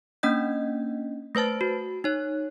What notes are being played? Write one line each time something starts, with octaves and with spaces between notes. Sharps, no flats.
A#3 C#4 D4 D#5 G6
A3 B4 C5 A5 A6
F#4
D#4 C#5